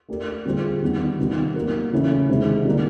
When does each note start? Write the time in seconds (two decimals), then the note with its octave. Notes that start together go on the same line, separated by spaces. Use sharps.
0.09 A3 D4 G4 A#4
0.46 D3 G3 C4 F4 G#4
0.82 D#3 G3 B3 D#4
1.18 C3 D#3 G3 B3
1.56 F#3 A#3 D#4 F#4 A#4
1.92 C#3 E3 A3 C#4 E4
2.29 C3 D#3 G#3
2.65 D3 G3 A#3 D#4